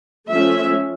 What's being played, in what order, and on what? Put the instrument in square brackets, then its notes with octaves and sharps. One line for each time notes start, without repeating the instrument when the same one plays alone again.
[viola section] F3 A3 C#4 E5